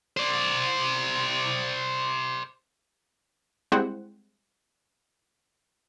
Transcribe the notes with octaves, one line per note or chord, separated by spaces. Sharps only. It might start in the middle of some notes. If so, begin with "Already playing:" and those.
C5 D5
G3 G#3 C4 E4 C5 F#5